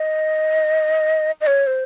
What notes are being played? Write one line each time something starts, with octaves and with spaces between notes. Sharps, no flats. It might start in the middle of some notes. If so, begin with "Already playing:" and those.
Already playing: D#5
D#5
C#5
C5